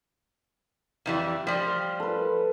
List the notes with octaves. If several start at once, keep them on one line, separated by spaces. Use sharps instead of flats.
F2 E3 G3
F3 G3 F5
A4 B4